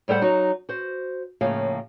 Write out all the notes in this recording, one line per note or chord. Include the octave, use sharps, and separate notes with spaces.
A2 G3 A4 C5 F#5
F#3 D#4 F#4
F#4 C5
A2 C#3 F3 A#3 F5